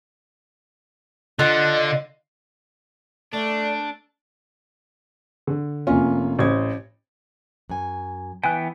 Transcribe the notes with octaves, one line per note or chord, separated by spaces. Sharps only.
D3 F4 D#5 F#5
A3 D4 D5
D3
F1 A#3 C#4 F4
A1 C5 G#6
F#2 G#5
E3 B3 G5 G#5 F#6